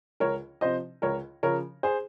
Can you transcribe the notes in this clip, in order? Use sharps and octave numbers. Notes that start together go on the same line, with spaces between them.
C#2 A#4 C#5
C3 F3 C5 D#5
C#2 A#4 C#5
C#3 F3 A#4 C#5
G#4 C5